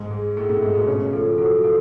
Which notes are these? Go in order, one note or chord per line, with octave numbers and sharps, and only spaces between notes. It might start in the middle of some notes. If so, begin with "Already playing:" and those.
Already playing: G#2 G#3
G#4
A2 A3 G#4
A2 A3
G#2 G#3 G#4
B2 B3
C#3 C#4 C#5
F3 F4 A4
F#3 F#4 A4
F3 F4 A4